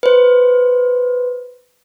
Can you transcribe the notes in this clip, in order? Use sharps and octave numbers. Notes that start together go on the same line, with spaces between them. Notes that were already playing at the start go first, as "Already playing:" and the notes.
B4 C5